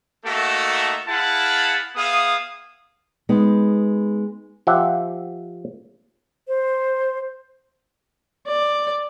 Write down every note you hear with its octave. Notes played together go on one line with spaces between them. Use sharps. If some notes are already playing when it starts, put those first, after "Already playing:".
A3 A#3 D#4 F#4 A4 E5
E4 G#4 F5 F#5 A5 B5
B3 G#4 E5 F5 D#6
G#3 B3 D#4
F3 G4 E5 F#5
C5
D5